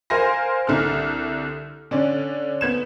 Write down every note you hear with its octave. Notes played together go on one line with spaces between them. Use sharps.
A#4 C5 F5 G#5 C6 A#6
C2 D3 A4 F6
D3 C#4 D5
B3 G#6 E7